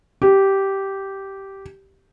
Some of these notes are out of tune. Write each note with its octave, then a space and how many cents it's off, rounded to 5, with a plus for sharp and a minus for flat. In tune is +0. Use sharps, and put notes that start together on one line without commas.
G4 -10